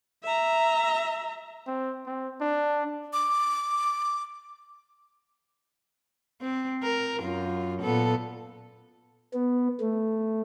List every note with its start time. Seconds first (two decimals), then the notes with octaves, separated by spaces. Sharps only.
0.24 E5 A#5
1.67 C4
2.06 C4
2.41 D4
3.13 D6
6.41 C4
6.83 A#4
7.20 F#2 F4
7.81 A#2 B3 A4
9.34 B3
9.80 A3